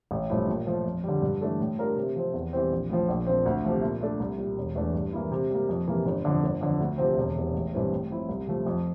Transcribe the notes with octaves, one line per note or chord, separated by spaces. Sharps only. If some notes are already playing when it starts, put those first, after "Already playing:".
A1
G2 F3 A3 E4
A#2
F3 A3
F2
D3 G3
G2
E3 A3 D4 A4
A2
G3 D4 F4 A#4
C3
F3 C4
E2
E3 G3 C4
A#1
A2 F3
A#1
A#2 F3 C4
D2
C3 F3 A3
A#2
A3 D4 A4
C2
A#2 G3
E1
E2 E3 A3 D4
G2
E3 A#3 E4
C3
G3 A#3
F2
C3 E3 A#3
G1
F2 D3
G1
F2 D3
D2
C3 F3 C4
E1
E2 C3
A1
G2 E3 G3 C4
A2
F3 C4 E4
C2
C3 F3 A3
F2